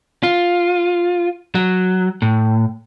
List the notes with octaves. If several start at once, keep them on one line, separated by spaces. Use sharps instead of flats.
F4
F#3
A2